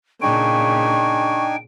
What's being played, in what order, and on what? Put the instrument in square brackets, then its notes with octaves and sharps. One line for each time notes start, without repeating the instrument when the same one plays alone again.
[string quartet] A#2 C#3 [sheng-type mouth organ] D4 D#4 G#5 [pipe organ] G5 [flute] C#6